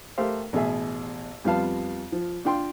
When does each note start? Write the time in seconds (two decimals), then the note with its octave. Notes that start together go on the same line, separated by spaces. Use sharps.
0.18 A3 G4 A4 A#4 C5 F5
0.53 A1 B2 G#4 E5
1.44 F2 G3 B3 F4 F5 A5
2.12 F3
2.45 D4 F4 G5 C6